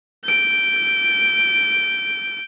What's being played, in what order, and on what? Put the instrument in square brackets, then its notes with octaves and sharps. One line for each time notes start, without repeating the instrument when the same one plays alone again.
[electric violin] G6 D7